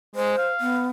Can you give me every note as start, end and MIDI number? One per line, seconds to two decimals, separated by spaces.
0.15 0.36 56
0.15 0.49 72
0.38 0.88 77
0.60 0.90 59